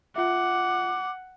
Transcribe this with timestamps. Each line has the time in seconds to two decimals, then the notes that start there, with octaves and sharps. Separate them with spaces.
0.16 F4 E5 F#5 D6